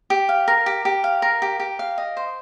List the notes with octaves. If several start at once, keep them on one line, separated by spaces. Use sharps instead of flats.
G4
F5
A#4
G4
G4
F5
A#4
G4
G4
F5
D#5
C5